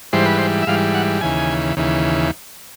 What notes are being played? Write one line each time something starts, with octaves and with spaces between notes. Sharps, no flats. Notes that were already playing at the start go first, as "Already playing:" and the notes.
G#2 E3 G3 C5
B4
C5
E5
G#2 E3 G3 F5
F#5
D#2 C#3 E3 G#5
D#2 C#3 E3